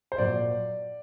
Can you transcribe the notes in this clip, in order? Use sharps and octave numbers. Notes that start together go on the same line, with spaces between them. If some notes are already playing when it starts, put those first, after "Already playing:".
C5
A#2 F#3 D5